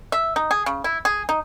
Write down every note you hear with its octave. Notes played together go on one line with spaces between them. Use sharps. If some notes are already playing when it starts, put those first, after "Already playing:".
E5
D#4
G#4
C#3
E4
G#4
D#4